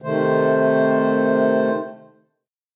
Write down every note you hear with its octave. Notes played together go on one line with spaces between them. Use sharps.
C3 D#3 A3 C5